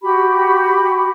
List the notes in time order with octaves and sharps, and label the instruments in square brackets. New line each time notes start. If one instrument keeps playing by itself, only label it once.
[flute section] F#4 G4 B5